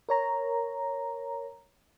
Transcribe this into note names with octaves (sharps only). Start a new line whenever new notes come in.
A#4 C#5 A#5